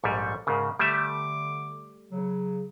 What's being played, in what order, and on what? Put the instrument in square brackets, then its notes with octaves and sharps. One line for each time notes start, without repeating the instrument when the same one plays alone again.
[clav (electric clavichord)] A#1 G#2 G3 [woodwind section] A4 C6 C#6
[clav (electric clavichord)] G#2 C#3 [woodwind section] A#4
[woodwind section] D3 D6 [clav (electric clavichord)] G3 A3 E5
[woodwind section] C#3 F#3